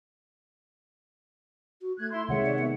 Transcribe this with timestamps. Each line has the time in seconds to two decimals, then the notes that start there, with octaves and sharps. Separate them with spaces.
1.82 F#4
1.99 A3 F#6 G#6
2.11 E4 C6
2.29 C3 D#3 G#3 C#5 E5 F#5
2.46 D5
2.59 B3